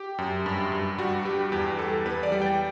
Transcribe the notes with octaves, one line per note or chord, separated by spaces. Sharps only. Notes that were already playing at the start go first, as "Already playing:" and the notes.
Already playing: G4
F#2
G2
G2
G3 F#4
G2 G4
E2 G4
G3 A4
E2 B4
D5
G3
G5